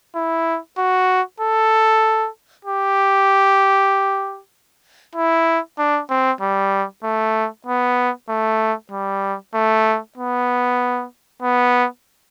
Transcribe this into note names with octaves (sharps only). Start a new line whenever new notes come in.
E4
F#4
A4
G4
E4
D4
C4
G3
A3
B3
A3
G3
A3
B3
B3